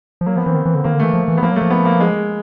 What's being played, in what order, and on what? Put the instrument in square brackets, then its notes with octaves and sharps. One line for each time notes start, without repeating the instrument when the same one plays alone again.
[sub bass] F3
[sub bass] F#3 [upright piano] A#3
[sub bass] F3 [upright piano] B3
[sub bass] E3 [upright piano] C4
[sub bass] D#3
E3
D3
[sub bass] D#3 [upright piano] A#3
[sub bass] D3
[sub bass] E3 [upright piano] A3
[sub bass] F3
E3
[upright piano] B3
[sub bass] F3 [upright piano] A#3
[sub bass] F#3
[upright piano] A3
[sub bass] F3
[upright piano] B3
A#3
G#3